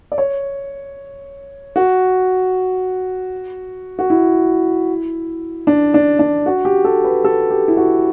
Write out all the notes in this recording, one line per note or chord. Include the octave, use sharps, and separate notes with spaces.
D5
C#5
F#4
F#4
E4
D4
D4
D4
F#4
G4
A4
B4
A4
G4
E4
F#4